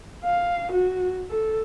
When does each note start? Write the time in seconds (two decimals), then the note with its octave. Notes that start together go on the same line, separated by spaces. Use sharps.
0.24 F5
0.73 F#4
1.30 A4